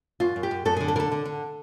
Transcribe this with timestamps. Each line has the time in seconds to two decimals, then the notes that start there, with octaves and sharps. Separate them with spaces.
0.20 F#2 F4
0.36 F#2
0.43 G4
0.51 F#2
0.65 F#2 A4
0.77 D3 G#4
0.88 A4
0.96 D3 A#4
1.00 A4
1.12 D3
1.25 D3